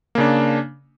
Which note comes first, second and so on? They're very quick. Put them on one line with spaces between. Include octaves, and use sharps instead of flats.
A#3 C#3 D4